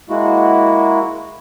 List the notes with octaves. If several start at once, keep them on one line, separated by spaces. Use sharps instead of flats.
G#3 A#3 E4 F#4